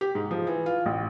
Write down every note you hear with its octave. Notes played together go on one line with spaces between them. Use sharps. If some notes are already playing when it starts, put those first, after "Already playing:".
G4
G#2
F3
E3
F4
A1